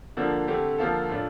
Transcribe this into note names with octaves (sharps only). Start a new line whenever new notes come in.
D3 F3 A#3 D4
D3 A3 C4 G4
D3 F3 A#3 F4 A4
A2 A3 D4 F4